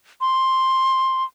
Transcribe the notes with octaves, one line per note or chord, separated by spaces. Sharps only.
C6